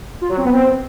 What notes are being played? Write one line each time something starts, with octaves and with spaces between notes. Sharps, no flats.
F4
F#3
C4
B3
C4